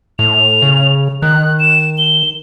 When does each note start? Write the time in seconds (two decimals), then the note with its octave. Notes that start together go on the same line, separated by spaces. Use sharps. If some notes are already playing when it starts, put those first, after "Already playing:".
0.19 A2 F7
0.62 C#3
1.22 D#3 F#6
1.60 E7
1.98 G7